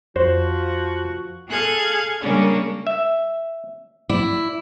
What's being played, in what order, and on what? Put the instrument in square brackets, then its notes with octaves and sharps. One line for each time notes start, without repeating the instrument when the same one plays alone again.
[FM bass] F2 [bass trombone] F3 [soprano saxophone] F#4 [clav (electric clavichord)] C5
[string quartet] G#4 A4 F5 F#6 G#6
C#3 G3 G#3 A#3 C#4 D4
[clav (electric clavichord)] E5
[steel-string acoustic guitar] E4 [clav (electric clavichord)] D5